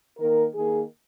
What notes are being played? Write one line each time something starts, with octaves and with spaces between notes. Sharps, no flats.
D#3 A#3 A#4
D#3 A#3 G#4